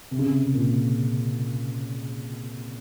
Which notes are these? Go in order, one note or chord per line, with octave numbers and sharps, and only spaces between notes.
C3
C#3
C3
C3
A#2